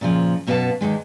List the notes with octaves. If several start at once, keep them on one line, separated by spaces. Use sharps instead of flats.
A#2 C#3 F3
F#2 B2 B3 F#4 F5 A5
E2 D#3 G#3